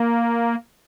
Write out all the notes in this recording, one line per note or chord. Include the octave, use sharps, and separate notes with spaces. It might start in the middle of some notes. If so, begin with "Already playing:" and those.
Already playing: A#3